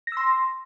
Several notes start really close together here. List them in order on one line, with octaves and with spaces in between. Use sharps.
A#6 E6 C6